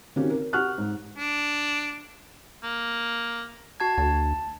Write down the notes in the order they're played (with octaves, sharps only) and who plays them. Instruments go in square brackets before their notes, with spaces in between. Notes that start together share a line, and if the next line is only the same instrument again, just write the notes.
[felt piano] D#3 A#3 C4 C#4 F#4 G4
A#4
G4 F#5 C#6 F6 F#6
G#2
[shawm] D4
[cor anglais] A#3
[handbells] F#4 A5 G#6
[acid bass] D2 [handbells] A5